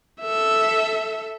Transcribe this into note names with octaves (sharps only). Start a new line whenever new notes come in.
A4 E5